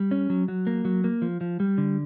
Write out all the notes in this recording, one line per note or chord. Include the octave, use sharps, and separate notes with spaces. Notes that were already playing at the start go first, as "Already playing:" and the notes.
Already playing: G3
C#4
F#3
F#3
A#3
F#3
A#3
F3
F3
G3
D3